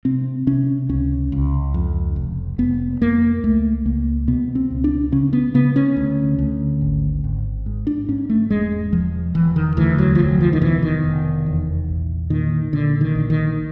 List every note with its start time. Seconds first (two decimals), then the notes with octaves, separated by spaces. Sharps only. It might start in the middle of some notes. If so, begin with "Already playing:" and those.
0.05 C3 C4
0.47 C3 C#4
0.89 C#2 C#4
1.32 C#2
1.74 F2
2.16 F1
2.58 F1 B3
3.01 F2 A#3
3.43 C#2 A3
3.86 C#2 A#3
4.28 B2 B3
4.55 C4
4.71 C#2
4.84 D4
5.12 C#3 C#4
5.33 B3
5.54 C#3 B3
5.76 C#4
5.97 D2
6.39 D2
6.81 G#1
7.24 G#1
7.66 G#2
7.87 D4
8.09 G#2 C#4
8.30 A3
8.50 E1 G#3
8.92 E1 F3
9.34 E1 E3
9.56 D#3
9.77 D2 E3
9.98 F#3
10.15 F3
10.19 F1 F#3
10.41 F3
10.53 D#3
10.61 B2 E3
10.83 D#3
11.04 F1
11.46 E2
11.88 A#1
12.30 A#2 D#3
12.72 A#2 D3
13.01 D#3
13.15 A#1
13.30 D#3